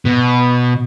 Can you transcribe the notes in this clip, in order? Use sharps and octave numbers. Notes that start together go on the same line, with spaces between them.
B2